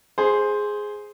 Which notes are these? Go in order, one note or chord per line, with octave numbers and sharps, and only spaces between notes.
G#4 C5